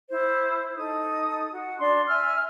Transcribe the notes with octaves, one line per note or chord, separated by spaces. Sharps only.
E4 C5
D#4 A4 D#6
F#4
D4 C6
E5 G#5 E6 F6